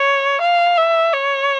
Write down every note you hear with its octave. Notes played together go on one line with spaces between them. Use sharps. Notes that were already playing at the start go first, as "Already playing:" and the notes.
Already playing: C#5
F5
E5
C#5